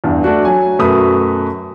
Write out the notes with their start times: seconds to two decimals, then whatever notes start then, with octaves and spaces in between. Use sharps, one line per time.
0.04 E2 G2
0.24 A3 D4 F#4
0.45 F#3 G#5
0.79 F#2 B2 A3 B4 D#6